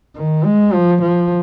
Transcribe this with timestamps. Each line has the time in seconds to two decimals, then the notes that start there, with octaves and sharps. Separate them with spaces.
0.16 D#3
0.45 G#3
0.73 F3
1.02 F3